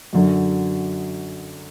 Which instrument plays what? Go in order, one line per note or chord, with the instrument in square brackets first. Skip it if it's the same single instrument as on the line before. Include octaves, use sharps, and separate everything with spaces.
[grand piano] F#2 D3 F#3